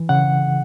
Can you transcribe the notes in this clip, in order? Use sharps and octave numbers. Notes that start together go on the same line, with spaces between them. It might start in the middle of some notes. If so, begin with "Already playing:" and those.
Already playing: E3
C#3 F#5